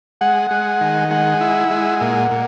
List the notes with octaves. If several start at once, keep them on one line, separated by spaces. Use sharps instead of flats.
G#3 F#5
G#3
D#3
G#3 F#5
E4
G#3
A#2
A#2